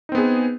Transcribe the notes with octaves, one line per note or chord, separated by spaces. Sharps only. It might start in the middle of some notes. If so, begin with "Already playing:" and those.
B3 C4 D#4 G#4